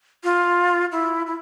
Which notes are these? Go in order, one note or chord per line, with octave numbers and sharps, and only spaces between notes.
F4
E4
E4